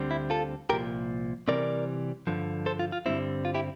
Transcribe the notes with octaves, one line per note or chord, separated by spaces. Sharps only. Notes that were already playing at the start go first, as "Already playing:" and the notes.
Already playing: D2 D3 G3 C4
E4
F4 A4
C2 A#2 F3 G4 A#4
C3 E3 G3 C4 A#4 D5
G2 D3 F3
A4 C5
F4
F4
G2 D3 G3 C4 E4
F4
E4 G4